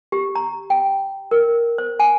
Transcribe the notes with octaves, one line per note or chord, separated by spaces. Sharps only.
G4
A#5
G5
A#4
C5
G#5